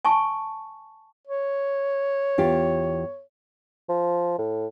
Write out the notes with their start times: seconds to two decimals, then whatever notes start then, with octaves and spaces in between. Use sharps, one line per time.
0.05 G#5 A5 C#6
1.27 C#5
2.38 E2 F4 G4
3.89 F3
4.38 A2